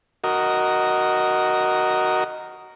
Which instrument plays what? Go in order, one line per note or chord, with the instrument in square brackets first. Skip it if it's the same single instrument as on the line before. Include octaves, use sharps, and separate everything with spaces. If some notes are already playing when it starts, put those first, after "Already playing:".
[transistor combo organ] F#4 A#4 D#5